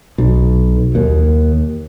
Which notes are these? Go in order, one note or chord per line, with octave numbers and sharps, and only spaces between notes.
B1
D#2